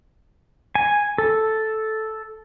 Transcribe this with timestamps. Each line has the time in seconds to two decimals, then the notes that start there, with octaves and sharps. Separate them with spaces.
0.75 G#5
1.18 A4